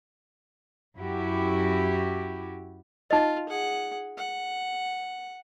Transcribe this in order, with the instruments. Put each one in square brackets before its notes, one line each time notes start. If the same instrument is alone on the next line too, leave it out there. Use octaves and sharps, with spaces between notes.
[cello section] F#2 E4 F#4 G4
[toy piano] D#4 D#5 [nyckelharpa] F4
[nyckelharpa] G#4 F#5
F#5